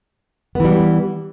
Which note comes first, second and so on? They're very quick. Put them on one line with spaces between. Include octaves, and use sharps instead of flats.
B3 E3 G3